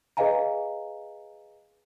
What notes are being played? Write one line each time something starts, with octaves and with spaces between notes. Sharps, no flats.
G#4 B4 D#5 F5 G#5 A#5